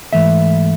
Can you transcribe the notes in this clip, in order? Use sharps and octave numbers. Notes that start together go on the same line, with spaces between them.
G#2 E3 A3 E5